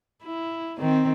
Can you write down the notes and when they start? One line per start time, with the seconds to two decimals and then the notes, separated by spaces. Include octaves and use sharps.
0.23 E4
0.78 D#3 C4